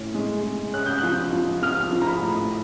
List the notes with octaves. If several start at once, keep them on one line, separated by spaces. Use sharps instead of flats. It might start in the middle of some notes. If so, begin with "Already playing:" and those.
Already playing: A2 C#4
G#3
G#3
C#4 F#6
G6
F#6
F3
F3
F3 F6
F3
A#5
B5
A2